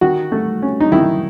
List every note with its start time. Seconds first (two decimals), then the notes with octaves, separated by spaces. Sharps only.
0.01 D#3 F#4
0.32 A3
0.62 C#4
0.80 D#4
0.92 D#3 E4